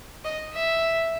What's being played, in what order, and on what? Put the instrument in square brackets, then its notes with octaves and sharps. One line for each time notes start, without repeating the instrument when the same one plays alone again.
[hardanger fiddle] D#5
E5